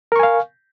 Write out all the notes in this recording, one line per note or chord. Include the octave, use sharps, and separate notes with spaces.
A#4 F5 G#5 C#6